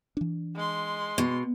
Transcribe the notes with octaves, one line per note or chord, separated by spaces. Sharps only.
E3 D4
G#3 C6
B2